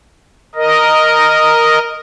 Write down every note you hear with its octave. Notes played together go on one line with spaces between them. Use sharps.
A#4 D#5